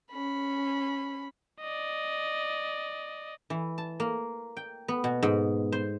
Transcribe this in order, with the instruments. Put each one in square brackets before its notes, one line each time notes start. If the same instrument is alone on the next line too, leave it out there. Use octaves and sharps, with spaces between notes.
[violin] C#4 B5
[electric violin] D5 D#5
[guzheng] E3
A5
A#3
G5
B3
B2
G#2
C5